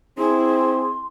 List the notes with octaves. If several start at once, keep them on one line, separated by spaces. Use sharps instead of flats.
C4 E4 G#4 C6